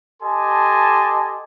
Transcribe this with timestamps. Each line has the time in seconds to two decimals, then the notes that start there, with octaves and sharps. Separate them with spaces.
0.23 G4 A4 D#5 G#5 A5 C6